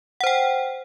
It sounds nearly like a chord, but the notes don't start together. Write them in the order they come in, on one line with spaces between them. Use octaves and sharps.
F#5 C5 G5